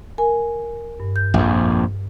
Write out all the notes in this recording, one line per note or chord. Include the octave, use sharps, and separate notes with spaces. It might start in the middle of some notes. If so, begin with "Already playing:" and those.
A#4 G#5
G2
G6
A#1 F2